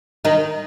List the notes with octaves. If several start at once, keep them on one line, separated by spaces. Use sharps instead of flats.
D#3 D#4